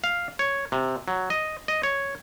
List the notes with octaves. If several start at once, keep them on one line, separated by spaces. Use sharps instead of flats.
F5
C#5
C3
F#3
D#5
D#5
C#5